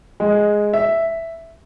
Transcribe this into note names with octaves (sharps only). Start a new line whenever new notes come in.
G#3
E5